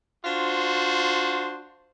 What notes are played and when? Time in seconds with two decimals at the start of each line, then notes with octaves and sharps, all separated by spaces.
0.25 D4 F4 F#4 C5